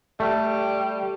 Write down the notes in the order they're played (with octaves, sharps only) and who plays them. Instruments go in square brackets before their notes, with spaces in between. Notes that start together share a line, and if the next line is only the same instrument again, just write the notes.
[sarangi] G3 [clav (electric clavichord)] A3